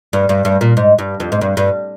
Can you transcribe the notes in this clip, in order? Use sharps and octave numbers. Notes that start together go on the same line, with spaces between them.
G2
G2
G2
A#2
G#2
G2
F2
G#2
G2
G2